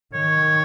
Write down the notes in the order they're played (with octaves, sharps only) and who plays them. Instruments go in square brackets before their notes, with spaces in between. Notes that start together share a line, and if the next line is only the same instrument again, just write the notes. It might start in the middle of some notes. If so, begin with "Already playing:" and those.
[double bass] D#3 [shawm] C#5